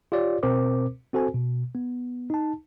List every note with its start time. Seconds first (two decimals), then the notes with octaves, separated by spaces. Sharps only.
0.12 F4 G4 C#5 D5
0.43 B2 C4 A#4 C5 D6
1.13 C4 F#4 A4 C5 G#5
1.34 B2
1.75 B3
2.30 D#4 A5